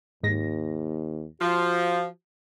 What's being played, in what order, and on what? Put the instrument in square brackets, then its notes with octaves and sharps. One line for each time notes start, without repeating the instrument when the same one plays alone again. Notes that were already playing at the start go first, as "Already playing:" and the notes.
[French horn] D#2 [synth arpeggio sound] G#2 A#6
[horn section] F3 [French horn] F#4